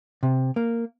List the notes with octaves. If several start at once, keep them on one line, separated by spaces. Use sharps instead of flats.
C3
A#3